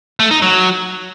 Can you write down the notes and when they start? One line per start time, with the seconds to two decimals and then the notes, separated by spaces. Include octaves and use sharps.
0.20 A3
0.31 D#4
0.42 F#3